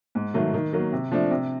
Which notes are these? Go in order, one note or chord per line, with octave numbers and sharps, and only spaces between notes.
G#2
D#3 F#3 A3
D#3
F#3 A#3
C3
F3 A3 D4
C3